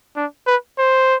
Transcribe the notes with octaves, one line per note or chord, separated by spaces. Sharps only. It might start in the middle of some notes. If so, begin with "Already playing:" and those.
D4
B4
C5